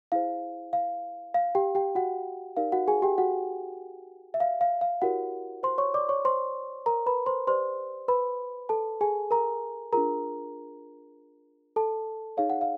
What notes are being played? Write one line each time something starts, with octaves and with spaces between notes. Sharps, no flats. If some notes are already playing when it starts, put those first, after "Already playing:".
E4 G#4 C5 F5
F5
F5
G4 G5
G4 G5
F#4 F#5
D#4 G4 A#4 D5 F5
F#4 F#5
G#4 G#5
G4 G5
F#4 F#5
E5
F5
F5
F5
E4 F#4 G4 A#4 C#5 F#5
C5 C6
C#5 C#6
D5 D6
C#5 C#6
C5 C6
A#4 A#5
B4 B5
C5 C6
G4 B4 C5 D5 C6
B4 B5
A4 A5
G#4 G#5
A#4 A#5
D4 F4 G#4 A#4 A#5
A4 A5
D#4 G#4 C#5 F5
F#5
F5